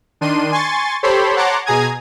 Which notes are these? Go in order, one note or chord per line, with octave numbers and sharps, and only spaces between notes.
D#3 D4 C6 D#7
G#5 C6 C#6 A6
G4 A4 C5 C#5 B5 C6
C#5 F#5 A5 A#5 C6 D6
B2 G#4 G#5 A#5 D#6 G#6